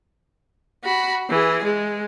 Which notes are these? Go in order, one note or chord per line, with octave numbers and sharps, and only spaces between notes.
F#4 B5
E3 G#4
G#3